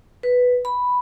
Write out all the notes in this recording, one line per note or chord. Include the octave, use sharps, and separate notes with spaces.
B4
B5